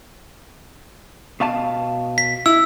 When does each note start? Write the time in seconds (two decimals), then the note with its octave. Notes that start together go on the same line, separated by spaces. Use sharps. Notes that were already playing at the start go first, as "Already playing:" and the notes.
1.40 B2 F5 A5
2.18 B6
2.46 E4 E6